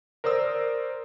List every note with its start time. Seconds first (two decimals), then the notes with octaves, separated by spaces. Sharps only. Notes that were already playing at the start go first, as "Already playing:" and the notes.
0.24 A#4 C5 D5 D#6 E6